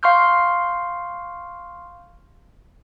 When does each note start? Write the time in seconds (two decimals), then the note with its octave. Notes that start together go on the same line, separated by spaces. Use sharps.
0.03 F5 C6 C#6 F6 G6